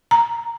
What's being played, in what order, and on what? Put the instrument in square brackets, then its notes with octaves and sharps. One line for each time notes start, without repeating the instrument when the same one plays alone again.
[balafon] A#5